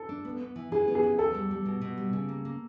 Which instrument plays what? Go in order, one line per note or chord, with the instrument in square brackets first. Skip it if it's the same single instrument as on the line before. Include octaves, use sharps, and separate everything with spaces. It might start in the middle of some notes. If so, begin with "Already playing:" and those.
Already playing: [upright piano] A4
[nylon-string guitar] D4
B3
B3
E3
[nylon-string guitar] E3 [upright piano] G#4
[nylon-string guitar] B3
[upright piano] G#4
[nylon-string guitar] E3
[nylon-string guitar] E2 [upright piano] A4
[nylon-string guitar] G3
G3
B2
B2
G3
C#3
A#3
A#3